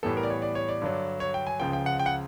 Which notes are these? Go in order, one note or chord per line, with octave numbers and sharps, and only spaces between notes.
A2 E3 G3 B3 A4
A#4
D5
C#5
D5
C#5
D5
G2 D3 F#3
C#5
G5
G#5
C#2 C#3 F3 G5
G5
F#5
G5
F#5